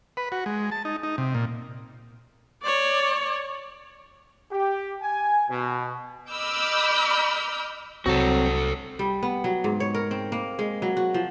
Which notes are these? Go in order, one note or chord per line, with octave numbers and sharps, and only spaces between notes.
B4
F#4
G#3
A5
D#4
D#4
C3
A#2
C#5 D5
G4
G#5
B2
D#5 B5 D6 E6 F6 G6
C2 F#3 G#3 C4 F#4 A4
G3
B3
F#3
G#2
C#5
A#4
C4
A#3
G#3
F#3
F#4
F3